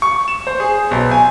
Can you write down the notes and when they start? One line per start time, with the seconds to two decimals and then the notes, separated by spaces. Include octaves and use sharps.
0.02 C#6
0.28 E7
0.47 C5
0.60 G#4
0.91 B1
1.11 G#5